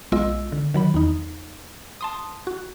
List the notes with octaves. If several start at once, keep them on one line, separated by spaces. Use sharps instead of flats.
B1 G#3 B3 F4 D#5 E6
D3
D#3 F#3 B5
E2 D#4
A5 C6 D#6
F#4